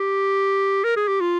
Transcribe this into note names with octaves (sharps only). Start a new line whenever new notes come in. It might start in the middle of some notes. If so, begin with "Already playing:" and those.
Already playing: G4
A#4
G#4
G4
F4